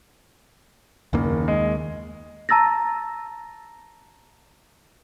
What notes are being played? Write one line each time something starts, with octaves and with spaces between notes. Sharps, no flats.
F#1 D#2 D#3 A#3
G#3
A5 A#5 E6 A6 A#6